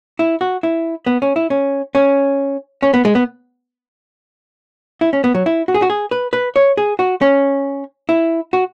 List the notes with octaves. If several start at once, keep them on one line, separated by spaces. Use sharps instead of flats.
E4
F#4
E4
B3
C#4
E4
C#4
C#4
C#4
B3
G#3
B3
E4
C#4
B3
F#3
E4
F#4
G#4
F#4
G#4
B4
B4
C#5
G#4
F#4
C#4
E4
F#4